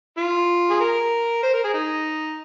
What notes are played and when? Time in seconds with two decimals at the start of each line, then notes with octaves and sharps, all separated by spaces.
0.18 F4
0.70 G#4
0.80 A#4
1.43 C5
1.54 A#4
1.64 G#4
1.74 D#4